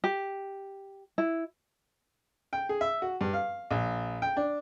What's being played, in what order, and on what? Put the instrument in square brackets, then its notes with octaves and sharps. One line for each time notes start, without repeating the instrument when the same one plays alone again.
[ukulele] G4
E4
[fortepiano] G5
G#4
E5
F#4
G2
F5
A#1
G5
D4